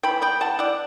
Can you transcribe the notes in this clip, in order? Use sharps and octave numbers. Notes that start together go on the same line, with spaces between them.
E3 G5 B5
B3 G5 B5
E3 F#5 A5
E4 D5 F#5